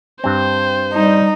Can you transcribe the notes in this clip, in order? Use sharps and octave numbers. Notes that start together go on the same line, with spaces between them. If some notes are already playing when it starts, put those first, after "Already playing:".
G2 C4 C5
G3 D#4